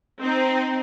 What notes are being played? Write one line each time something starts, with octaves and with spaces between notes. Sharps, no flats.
C4 D#4